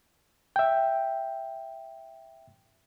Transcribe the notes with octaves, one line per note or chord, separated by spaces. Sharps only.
E5 G5